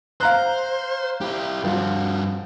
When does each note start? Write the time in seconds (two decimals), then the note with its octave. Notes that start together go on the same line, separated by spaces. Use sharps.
0.21 C5 F5 A#5 F#6
1.21 E4 G4
1.64 G2 F3 F#4